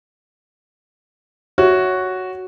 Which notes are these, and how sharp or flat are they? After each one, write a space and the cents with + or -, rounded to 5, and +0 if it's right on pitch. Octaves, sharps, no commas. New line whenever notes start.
F#4 +0 C#5 +5 E5 -10